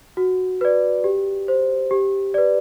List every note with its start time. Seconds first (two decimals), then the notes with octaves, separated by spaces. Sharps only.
0.17 F#4
0.61 B4 D5
1.04 G4
1.48 C5
1.91 G4
2.34 B4 D5